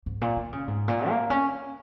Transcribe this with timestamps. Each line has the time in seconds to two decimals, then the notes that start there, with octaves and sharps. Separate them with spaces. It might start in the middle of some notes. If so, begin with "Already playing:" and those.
0.06 G#2
0.22 A#2
0.36 D#3
0.53 C#3
0.68 G#2
0.88 A#2
1.09 A#3
1.30 C#4